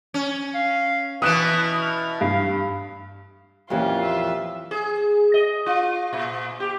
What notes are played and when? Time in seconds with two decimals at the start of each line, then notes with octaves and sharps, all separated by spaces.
0.14 C#4
0.55 F5
1.22 B2 E3 B4 D#6 F#6 E7
1.81 F6
2.21 G2 F5
3.70 F2 A#2 E3 F#3 C#4 F4 G4 C#5
4.02 E5
4.71 G#4
5.34 D#5
5.66 F4
6.13 A#2
6.60 G4